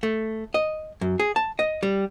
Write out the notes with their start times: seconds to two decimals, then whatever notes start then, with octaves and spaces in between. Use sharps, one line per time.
0.03 A3
0.54 D#5
1.01 F#2
1.20 G#4
1.36 A5
1.59 D#5
1.83 G3